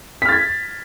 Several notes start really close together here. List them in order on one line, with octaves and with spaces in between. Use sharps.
B6 F6 A6 G#6